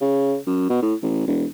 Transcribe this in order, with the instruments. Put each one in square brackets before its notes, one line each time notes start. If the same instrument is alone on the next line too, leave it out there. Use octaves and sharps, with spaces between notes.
[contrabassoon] C#3
F#2
B2
A2
A1
E1